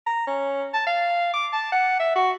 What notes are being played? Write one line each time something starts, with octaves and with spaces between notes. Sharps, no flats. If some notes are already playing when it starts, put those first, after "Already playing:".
A#5
C#4
A5
F5
D6
A5
F#5
E5
F#4